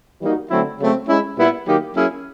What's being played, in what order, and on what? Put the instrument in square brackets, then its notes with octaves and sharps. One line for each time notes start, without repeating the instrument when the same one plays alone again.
[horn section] E3 G3 A#3 D#4 F#4
D3 F#3 A3 C4 E4
C#3 F#3 A3 C4
G#3 C#4 E4
A#2 G3 B3 E4
D#3 F#3 A#3 D#4 G4
F#3 A#3 C#4 E4 G#4